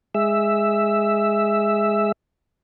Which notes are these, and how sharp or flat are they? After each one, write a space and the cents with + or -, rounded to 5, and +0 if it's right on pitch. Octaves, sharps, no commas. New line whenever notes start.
G#3 -5 E5 +0